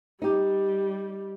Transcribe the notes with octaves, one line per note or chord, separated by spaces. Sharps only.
G3 D#4 G4